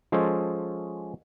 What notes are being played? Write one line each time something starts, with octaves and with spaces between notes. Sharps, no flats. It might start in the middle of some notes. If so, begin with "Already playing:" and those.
F3 G#3 C#4 G#4 A4 C5